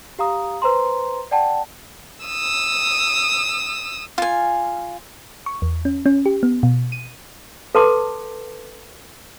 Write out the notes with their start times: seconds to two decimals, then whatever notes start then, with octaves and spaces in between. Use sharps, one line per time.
0.19 G4 F5 A#5 D#6
0.62 B4 C5 A#5 C6
1.31 D5 F#5 G5 A5
2.25 D#6 E6
4.18 F4 G#5
5.46 C#6
5.62 E2
5.85 C#4
6.06 C#4
6.26 G4
6.43 B3
6.63 B2
6.92 D#7
7.75 A4 B4 A5 C6 D6